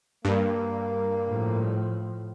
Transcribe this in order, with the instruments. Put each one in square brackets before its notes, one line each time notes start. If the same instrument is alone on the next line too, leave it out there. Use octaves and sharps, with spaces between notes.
[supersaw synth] G2 [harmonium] A#3
[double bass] A2 F3